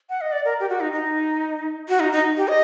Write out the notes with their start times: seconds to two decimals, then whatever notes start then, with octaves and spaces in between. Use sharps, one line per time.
0.09 F#5
0.21 D#5
0.32 D5
0.45 A#4
0.60 G4
0.69 F#4
0.80 D#4
0.93 D#4
1.89 F#4
2.00 D#4
2.12 D#4
2.37 G4
2.48 D#5